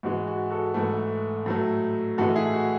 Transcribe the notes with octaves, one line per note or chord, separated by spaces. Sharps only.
G#2 E3 G#3 F#4
F#4
F#4 A4
G#2 E3 A3
A2 F#3 A3
A2 E3 G#3 F#4 A4
E4 G#4
F#4